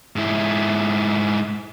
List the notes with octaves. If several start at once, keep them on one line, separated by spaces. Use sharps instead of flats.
G#2 E4